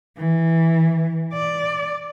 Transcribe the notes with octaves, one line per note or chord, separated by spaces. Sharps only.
E3
D5